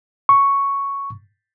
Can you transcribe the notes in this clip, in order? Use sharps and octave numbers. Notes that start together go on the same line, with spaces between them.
C#6